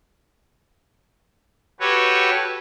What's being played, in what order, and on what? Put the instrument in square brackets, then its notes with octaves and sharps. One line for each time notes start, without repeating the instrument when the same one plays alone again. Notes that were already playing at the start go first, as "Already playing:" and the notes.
[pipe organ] F#4 G4 A4 B4 C#5